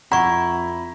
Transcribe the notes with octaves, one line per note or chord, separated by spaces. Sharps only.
F2 E4 F#5 A#5 C#6